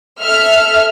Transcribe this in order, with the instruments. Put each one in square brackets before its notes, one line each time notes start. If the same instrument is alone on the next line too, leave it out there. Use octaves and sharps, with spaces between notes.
[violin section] A4 E5 F6